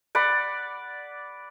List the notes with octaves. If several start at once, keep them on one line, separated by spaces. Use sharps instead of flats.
D5 F#5 B5